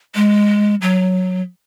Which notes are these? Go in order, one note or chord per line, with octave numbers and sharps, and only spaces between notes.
G#3
F#3